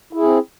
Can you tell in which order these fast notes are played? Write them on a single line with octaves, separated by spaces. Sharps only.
E4 G#4 C4